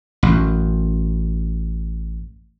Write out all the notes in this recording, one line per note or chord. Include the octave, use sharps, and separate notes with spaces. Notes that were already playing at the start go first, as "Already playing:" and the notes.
A1 F#2